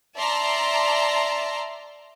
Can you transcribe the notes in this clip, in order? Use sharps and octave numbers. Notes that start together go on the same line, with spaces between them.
D5 E5 A5 A#5 C6